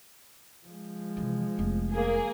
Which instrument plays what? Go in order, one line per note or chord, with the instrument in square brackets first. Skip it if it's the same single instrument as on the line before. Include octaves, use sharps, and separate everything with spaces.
[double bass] F3 G#3
[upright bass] C3 E3
F1 B3
[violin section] A#3 G#4